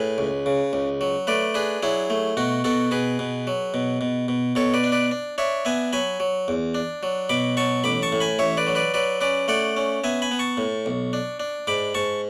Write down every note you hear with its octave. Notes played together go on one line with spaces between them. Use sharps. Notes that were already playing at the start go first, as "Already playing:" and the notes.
Already playing: A2 G#4 B4
C#2
C#3
C#2
F#3
A3 B4 D5
D4 G#4 B4
F#3 E4 G#4
A3
B2 F#4
B2 F#4 A4
B2 G#4 B4
B2
F#3
B2
B2
B2
B2 A4 C#5
B4 D5
D4
B4 D5
D4
D4 C#5 E5
B3 E5 G#5
F#3 G#5 B5
F#3
E2
D4
F#3
B2 B5 D6
F#3 A5 C#6
A1 B5 D6
A5 C#6
A2
G#5 B5
A1 C#5 E5
B4 D5
F#3
B4 D5
F#3 B4 D5
C#4 B4 D5
A3 D5 F#5
C#4
B3 E5 G#5
G#5 B5
B3
A5 C#6
A2
B1
D4
D4
G#2 B5 D6
G#2 A5 C#6